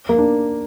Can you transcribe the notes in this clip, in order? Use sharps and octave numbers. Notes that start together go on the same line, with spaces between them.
A#3
D4